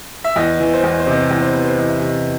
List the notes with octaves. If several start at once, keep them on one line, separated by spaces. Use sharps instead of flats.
E5
E2 D#5
E3
C5
E2 D#5
C5
C3 D#5
C5
E2 D#5
C5
E3 B4
C5
E2 D#5
E5
C3 D#5